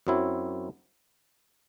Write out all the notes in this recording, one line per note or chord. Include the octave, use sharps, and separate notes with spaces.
F#2 F#3 C4 E4